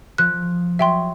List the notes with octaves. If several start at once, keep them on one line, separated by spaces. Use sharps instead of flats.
F3 F#6
F#3 E5 G5 C6